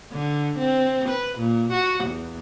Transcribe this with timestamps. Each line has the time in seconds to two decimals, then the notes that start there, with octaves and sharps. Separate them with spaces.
0.12 D3
0.59 C4
1.09 B4
1.39 A#2
1.72 F#4
2.05 E2